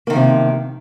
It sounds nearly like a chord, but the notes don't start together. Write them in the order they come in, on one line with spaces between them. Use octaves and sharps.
A#3 D#3 F3 C3